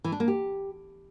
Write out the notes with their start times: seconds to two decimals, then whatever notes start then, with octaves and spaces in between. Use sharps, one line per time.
0.04 E3
0.12 D4
0.20 A#3
0.28 G4